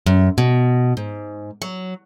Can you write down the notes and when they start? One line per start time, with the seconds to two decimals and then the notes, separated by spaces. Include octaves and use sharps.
0.06 F#2
0.38 B2
0.97 G#2
1.62 F#3